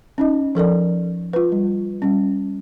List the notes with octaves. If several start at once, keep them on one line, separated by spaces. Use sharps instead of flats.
C#4 D#4 D#5
F3 A4 A#4 D5
F4 B4
G3
G3 C#4